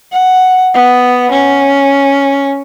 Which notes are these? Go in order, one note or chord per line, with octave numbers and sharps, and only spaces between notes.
F#5
B3
C#4